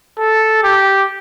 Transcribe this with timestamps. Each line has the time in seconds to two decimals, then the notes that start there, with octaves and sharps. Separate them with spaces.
0.19 A4
0.64 G4